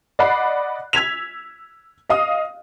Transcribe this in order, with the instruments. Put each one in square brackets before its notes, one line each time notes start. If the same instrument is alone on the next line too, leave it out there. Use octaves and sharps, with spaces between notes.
[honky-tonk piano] D5 D#5 F#5 B5 F#6 C7
E6 G#6 B6 F7
D#5 F5 D#6